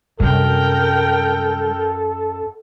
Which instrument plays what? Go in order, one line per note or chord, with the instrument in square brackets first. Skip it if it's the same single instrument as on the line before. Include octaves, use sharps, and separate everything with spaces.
[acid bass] F#2 [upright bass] C3 G3 [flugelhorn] A4 [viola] A#4 G5